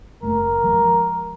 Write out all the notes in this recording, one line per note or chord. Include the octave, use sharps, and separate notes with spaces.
F#1 A3 A#4
F3 G#3